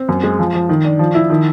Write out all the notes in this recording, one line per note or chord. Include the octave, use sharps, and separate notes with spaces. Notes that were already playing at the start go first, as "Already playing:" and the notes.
Already playing: C4
F#2
G#3
F3
F3
D#3
D4
F3
E4
D#3